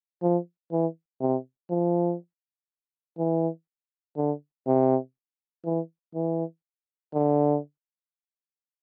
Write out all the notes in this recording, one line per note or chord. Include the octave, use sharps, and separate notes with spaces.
F3
E3
C3
F3
E3
D3
C3
E3
E3
D3